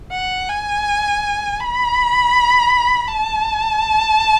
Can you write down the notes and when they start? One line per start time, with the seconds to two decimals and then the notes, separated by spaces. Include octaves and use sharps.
0.12 F#5
0.49 G#5
1.61 B5
3.08 A5